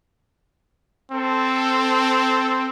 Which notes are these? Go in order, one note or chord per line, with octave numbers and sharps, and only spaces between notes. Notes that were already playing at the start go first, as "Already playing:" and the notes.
C4 A4